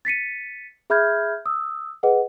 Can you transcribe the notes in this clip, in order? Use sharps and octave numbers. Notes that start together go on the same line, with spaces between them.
A6 B6 C#7 D#7
G#4 E5 B5 F6 G6 G#6
D#6 E6
G#4 B4 D#5 F#5